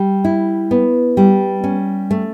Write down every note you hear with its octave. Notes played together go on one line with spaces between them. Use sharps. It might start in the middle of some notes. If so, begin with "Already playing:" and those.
Already playing: G3
E4
B3
G3
C#4
A3